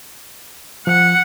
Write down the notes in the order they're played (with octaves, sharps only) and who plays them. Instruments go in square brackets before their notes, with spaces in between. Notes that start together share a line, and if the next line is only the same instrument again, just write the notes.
[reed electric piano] F3 [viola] F#5